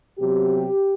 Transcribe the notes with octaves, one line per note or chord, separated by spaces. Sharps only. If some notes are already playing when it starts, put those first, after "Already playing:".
C3 F#3 B3 G4